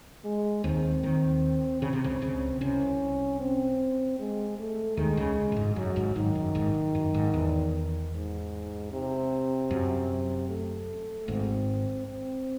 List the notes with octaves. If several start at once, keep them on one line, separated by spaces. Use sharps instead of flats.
G#3
D#2 D#3 C4
D#2 D#3
C#3 C4
C3
C#2 C#3
C#2 C#3
C2 C3 C#4
C4
G#3
A3
D#2 D#3 G#3
C#2 C#3
F#2
G#1 G#2
F#2 F#3
G#1 G#2
G#1 G#2 D#3
F#2
G#1 G#2
F#2
G#1 G#2
E2
G#2
C3
F#2
A3
G#1 G#2 C4
C4